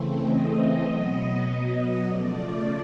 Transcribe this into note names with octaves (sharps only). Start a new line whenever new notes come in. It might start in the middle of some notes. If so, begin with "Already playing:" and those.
Already playing: C#3 E3 A3 C4
D#5
B2 F#3 B3
C#3 F3 A3 D5